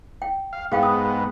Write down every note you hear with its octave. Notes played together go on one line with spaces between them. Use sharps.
G5
F5
G#2 B3 G#4 F5 G5
D#6